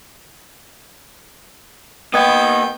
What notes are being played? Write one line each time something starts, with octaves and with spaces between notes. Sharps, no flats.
A#3 B3 D#5 G5 D#6 G#6